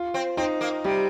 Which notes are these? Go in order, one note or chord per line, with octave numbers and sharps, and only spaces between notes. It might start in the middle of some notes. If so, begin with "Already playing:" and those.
Already playing: F4
C4
C4 D#4
A#3
C3 G3